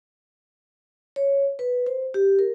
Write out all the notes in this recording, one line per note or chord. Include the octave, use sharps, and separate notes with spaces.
C#5
B4
C5
G4
A#4